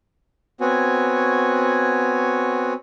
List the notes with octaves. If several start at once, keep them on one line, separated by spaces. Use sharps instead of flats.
B3 C4 F#4 C#5 G#5